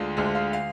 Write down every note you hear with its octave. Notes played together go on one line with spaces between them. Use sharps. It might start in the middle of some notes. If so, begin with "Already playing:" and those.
Already playing: D2 D3 G#3 F4
D2 D3 G#3
F5
F5